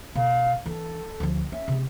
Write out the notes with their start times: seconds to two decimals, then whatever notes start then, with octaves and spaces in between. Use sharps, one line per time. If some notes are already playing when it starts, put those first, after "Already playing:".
0.15 B2 F5
0.66 E3 D4 A4
1.20 D2 F3
1.52 C#4 E5
1.68 C3 G#3